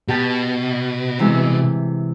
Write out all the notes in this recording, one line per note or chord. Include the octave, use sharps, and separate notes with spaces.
B2 G4 G5 A5
C3 E3 G#3